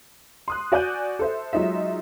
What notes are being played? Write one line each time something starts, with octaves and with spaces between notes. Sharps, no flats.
C6 D#6 F#6
F#4 D5 G#5 F#6 G6 D#7
A4 C5 E5
F#3 G#3 D#4 F4 E5